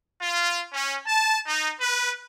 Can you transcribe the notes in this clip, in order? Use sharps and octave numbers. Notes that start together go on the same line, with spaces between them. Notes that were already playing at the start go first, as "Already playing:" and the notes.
F4
C#4
A5
D#4
B4